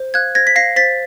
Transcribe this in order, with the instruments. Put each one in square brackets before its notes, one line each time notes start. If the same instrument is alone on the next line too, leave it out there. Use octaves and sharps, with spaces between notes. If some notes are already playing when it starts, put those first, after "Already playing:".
Already playing: [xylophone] C5
F5 F#6 G#6
C5 G#6 A#6
B6
F5 A#6 C7
C5 A6 B6